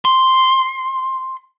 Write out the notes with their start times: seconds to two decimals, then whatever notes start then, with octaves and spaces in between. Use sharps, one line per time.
0.05 C6